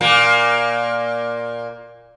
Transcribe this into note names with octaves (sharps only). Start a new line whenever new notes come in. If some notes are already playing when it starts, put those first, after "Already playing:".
A#2 A#3